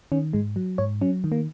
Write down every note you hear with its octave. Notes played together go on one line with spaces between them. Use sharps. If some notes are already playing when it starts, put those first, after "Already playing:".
D#3 C#4
G#2 G#3
F#3
G#2 C#5
F#3 C#4
D#3
A#3